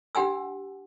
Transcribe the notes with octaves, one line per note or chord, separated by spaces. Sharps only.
D4 G4 F#5 G#5 E6